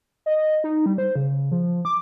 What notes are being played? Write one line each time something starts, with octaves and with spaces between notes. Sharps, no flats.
D#5
D#4
G3
C5
C#3
F3
D6